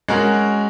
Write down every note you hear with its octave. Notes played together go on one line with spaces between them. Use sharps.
G#3 C#4 F#4 A#4